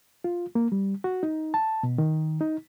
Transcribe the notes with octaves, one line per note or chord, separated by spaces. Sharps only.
F4
A#3
G3
F#4
D#4
A5
B2
D#3
D#4